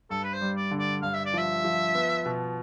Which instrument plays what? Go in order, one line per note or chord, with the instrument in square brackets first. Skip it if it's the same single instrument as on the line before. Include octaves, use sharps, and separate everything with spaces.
[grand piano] G2 [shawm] A4
[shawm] B4
C5
[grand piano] G3
[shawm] D5
[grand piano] D3
[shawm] D5
[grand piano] G2 [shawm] F5
[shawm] E5
D5
[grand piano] F3 [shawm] E5
[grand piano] F3
B3
B2